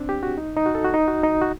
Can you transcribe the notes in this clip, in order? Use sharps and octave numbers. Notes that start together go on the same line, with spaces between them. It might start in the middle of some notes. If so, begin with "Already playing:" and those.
Already playing: C4 D4
G4
F#4
D#4
D#4
F#4
A4
F#4
D#4
F#4
D#4
F#4